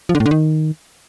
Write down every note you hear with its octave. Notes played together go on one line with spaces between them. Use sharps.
F3
D3
A2
D3
D#3